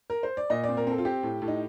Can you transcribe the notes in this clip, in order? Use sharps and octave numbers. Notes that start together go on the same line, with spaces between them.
A#4
C5
D5
A#2 D#5
C4 D5
A#4
C4 A4
F4
C4 G4
A2
A2
D#4